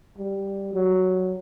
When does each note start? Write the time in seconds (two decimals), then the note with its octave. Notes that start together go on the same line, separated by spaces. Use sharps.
0.18 G3
0.74 F#3